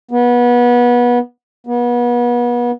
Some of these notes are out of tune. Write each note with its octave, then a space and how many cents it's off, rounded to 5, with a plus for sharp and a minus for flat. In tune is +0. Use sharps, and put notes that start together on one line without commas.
B3 -25
B3 -35